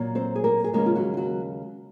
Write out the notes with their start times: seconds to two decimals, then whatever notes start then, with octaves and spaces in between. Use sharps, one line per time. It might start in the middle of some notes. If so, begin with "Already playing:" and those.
Already playing: A#2 F#3 A#3
0.15 C4 C5
0.36 G#4
0.44 A#3 A#4
0.64 G#4
0.73 D#2 C#3 F3 G#3 A#3 A#4
0.86 F4
0.95 F#3 F#4
1.14 F4
1.17 F#3 F#4